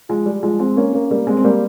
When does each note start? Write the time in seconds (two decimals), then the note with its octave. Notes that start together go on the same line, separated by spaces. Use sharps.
0.09 F3 G#3
0.26 G3
0.43 F3 G#3
0.59 G#3 C4
0.77 A#3 C#4
0.93 A#3 C#4
1.11 G3 A#3
1.27 G#3 C4
1.37 C4
1.44 G3 A#3